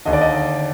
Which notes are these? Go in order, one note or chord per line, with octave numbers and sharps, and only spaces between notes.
D#2 D3 D#5
D5
D#5